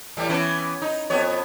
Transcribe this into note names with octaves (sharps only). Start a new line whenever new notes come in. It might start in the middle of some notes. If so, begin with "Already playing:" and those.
A2 E3 G3
E3 B3 C#4
D#4
F2 B3 C#5